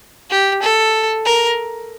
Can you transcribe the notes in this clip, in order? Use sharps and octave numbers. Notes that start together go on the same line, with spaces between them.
G4
A4
A#4